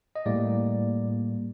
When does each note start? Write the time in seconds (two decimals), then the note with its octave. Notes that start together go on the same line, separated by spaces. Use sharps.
0.16 D#5
0.26 A2 G3 A#3 D5